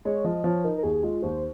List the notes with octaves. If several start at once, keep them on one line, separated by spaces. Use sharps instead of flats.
G#3 C#5
F3 D#5
F3 C#5
D#4 A#4
A#4
D#2 G#4
G#3 F4
D#2 C5